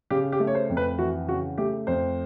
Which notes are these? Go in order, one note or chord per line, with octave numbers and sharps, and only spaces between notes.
C#3 G4
G4
A3
C#5
C5
F2
B4
E3 F#4
C#3 F#4
A3 G4
F2 C5